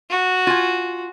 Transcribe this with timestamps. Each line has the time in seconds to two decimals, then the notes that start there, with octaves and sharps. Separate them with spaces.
0.10 F#4
0.47 F4 G#5